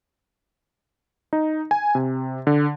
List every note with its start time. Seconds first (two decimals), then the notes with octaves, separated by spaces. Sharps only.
1.33 D#4
1.71 G#5
1.95 C3
2.47 D3